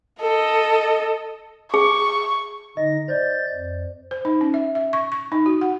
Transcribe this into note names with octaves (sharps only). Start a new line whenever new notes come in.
A4 D#5
G#4 C#6
D3 D#4 D#5 A#6
C5 D5 D#5 G6 A6
F2
C5
D#4
C#4
E5
E5
C#6
C#6
D#4
F#4
F#5